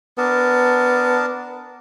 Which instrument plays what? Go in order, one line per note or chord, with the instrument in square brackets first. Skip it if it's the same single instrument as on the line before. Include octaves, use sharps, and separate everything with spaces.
[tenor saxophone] B3 [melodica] D4 A#4 A5